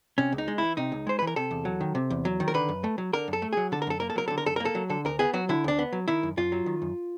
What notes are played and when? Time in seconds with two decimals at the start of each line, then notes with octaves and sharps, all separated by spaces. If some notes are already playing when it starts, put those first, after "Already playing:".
0.18 C3 C#4
0.32 C#2
0.38 D#4
0.48 G#3
0.58 E3 E4
0.77 C3 D#4
0.92 C#2
1.07 G#3 C5
1.19 B4
1.22 E3
1.27 A#4
1.36 C3 A4
1.51 E2
1.65 F#3
1.81 D#3
1.95 C3
2.10 E2
2.25 F#3
2.40 D#3
2.48 A#4
2.54 D3 B4
2.69 F#2
2.84 A3
2.98 F#3
3.13 D3 A#4
3.28 F#2
3.33 A4
3.42 A3
3.53 F#3 G#4
3.72 D3 A4
3.82 A#4
3.87 F#2 A4
4.00 A#3 A#4
4.10 A4
4.16 F#3 A#4
4.28 D3 A4
4.38 A#4
4.46 F#2 A4
4.56 A#4
4.60 A#3
4.65 A4
4.75 F#3
4.90 D3 A4
5.05 D2 A#4
5.19 B3 G#4
5.33 F#3 F#4
5.49 D3 E4
5.64 D2 D4
5.79 B3
5.93 F#3
6.08 D#3 E4
6.23 F#2
6.37 F#2 F4
6.52 F#3
6.66 D#3
6.82 F#2